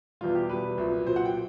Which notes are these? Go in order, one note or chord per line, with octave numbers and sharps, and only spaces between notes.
E2 B2 G3 F4
G4
E2 B2 G3 B4
C2 A#2 F#3
C2 A#2 F#3 C5
F#5
G5